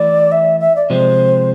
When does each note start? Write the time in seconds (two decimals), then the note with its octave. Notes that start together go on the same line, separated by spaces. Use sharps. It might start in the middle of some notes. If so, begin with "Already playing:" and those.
Already playing: E3 A3 E4 D5
0.32 E5
0.60 E5
0.76 D5
0.90 C3 F3 G#3 C5